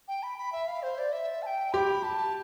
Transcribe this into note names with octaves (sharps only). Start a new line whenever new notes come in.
G5
B5
B5
E5
F5
C5
D5
E5
A5
G5
G4 B5 C6
A5